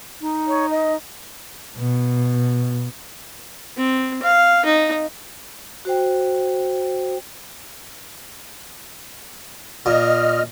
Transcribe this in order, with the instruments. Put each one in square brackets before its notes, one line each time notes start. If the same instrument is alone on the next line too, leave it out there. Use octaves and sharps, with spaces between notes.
[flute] D#4
[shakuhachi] C#5
D#5
[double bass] B2
[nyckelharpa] C4
F5
D#4
[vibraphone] F#4 C5 G5
[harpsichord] A#2 [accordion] D#5 F6